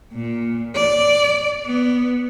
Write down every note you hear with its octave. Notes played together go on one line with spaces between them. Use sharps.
A#2
D5
B3